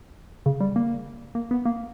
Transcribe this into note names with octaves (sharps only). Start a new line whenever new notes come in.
C#3
G3
A#3
A#3
B3
A#3